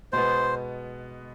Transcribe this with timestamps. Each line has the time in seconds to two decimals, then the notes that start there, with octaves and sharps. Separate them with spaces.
0.12 B2 G#3 B3 C5